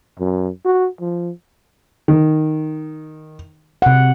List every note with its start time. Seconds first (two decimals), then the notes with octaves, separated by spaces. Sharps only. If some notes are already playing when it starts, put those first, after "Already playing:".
0.19 F#2
0.66 F#4
1.01 F3
2.08 D#3
3.82 C3 F#5